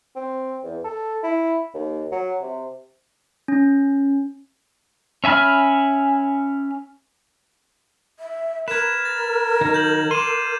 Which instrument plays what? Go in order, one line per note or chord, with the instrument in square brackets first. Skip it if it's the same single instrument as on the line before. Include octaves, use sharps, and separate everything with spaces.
[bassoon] C4
E2
A4
E4
D#2
F#3
C3
[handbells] C#4
[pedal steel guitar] C#4 E5 G#5 B5 F6
[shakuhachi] E5
[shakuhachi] A#4 [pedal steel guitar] B4 [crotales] G#6 E7
[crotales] A6
[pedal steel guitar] D#3 F#3 D#4
[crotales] G6 F#7
[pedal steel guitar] C6 D6 [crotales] D#7 E7